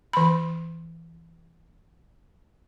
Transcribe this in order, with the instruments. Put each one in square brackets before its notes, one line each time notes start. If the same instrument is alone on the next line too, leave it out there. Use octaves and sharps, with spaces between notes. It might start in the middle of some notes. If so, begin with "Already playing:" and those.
[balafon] E3 B5